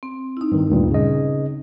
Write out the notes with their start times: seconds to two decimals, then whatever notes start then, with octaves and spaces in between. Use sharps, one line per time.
0.03 C4
0.37 D#4 E4
0.52 G2 D#3
0.70 D2 G2 A#2
0.91 C#3 D#5